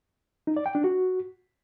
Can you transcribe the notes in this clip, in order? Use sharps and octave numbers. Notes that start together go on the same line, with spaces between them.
D#4
D5
G5
D4
F#4